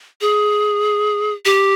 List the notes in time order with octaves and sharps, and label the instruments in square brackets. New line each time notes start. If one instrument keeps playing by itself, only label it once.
[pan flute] G#4
G4